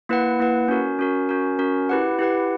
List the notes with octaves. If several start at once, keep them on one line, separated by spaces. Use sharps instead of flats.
A#3 E4 B4 F#5
A#3 E4 B4 F#5
C#4 F#4 A#4
C#4 F#4 A#4
C#4 F#4 A#4
C#4 F#4 A#4
E4 G4 B4 F#5
E4 G4 B4 F#5